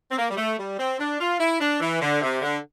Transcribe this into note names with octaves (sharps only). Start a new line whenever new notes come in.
C4
A#3
G3
A3
G3
C4
D4
F4
E4
D4
E3
D3
C3
D3